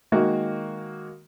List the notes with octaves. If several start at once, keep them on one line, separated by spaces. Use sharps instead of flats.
D#3 G#3 A#3 F#4